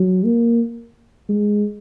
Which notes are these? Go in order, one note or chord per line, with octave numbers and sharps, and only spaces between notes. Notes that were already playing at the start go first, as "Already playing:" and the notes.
Already playing: F#3
A#3
G#3